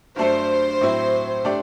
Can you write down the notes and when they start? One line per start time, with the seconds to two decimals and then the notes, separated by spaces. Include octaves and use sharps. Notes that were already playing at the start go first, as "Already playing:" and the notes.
0.16 G2 F#3 A3 D4 A4 C5
0.81 A2 F#3 C4 E4
1.45 A3 D4 G4 D5